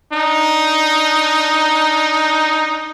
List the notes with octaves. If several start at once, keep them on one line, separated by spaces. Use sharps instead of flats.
D4 D#4